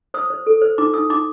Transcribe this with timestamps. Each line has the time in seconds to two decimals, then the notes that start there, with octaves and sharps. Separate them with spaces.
0.14 C5 D#6
0.30 C5
0.47 A4
0.61 C5
0.78 D#4 D6
0.94 D#4 D#6
1.10 D#4 D6